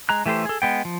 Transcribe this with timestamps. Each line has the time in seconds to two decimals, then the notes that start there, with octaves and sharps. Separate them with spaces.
0.09 G#3 A#5 F#6
0.26 E3 A3 G4 A4 C5
0.45 G#4 A4
0.62 G#3 B3 G5
0.85 F3